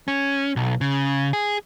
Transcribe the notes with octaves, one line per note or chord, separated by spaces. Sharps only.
C#4
B1
C#3
G#4